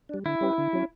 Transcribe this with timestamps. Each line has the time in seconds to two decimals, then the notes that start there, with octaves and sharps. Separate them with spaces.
0.09 G3 D4
0.25 D3 E4
0.41 G3 C#4 G4 B4
0.58 D3
0.73 F#3 C#4